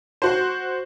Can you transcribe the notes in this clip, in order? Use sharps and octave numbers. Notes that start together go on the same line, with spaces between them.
F#4 C5